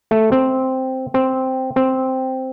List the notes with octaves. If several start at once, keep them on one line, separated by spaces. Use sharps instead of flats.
A3
C4
C4
C4